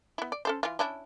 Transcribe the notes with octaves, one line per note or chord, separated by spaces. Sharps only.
B3 E4
D5
C#4 A4 C5
E3 F4
C#4 D4 E4